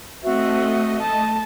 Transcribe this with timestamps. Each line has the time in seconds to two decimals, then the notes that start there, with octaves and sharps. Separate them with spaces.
0.24 A3 C4 F#4 D#5 E5
1.01 A5